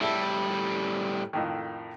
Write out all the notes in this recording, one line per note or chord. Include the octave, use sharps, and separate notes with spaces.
A2 G3 E4 A4
F2 A2 D#3